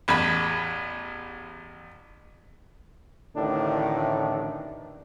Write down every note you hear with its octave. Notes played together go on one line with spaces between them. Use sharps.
A1 E2 B5
A1 A2 D3 D#3 D4